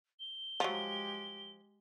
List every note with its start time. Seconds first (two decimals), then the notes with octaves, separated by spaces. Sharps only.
0.20 G7
0.60 F3 F#3 G#3 G4